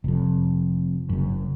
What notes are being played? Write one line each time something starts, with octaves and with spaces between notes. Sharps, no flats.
F1 F2
F#1 F#2